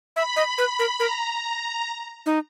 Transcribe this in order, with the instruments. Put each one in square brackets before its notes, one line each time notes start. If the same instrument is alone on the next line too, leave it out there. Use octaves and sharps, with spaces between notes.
[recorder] E5 [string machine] B5
[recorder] D#5
B4
A#4
[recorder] A#4 [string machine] A#5
[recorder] D#4